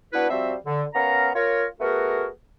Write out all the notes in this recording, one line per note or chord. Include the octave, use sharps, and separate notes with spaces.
B3 D4 E4 F#4 B4
F3 G3 C4 F#4 C5 E5
D3
B3 C#4 A#4 F5 A#5
F4 A#4 C#5
A3 B3 F#4 G#4 A#4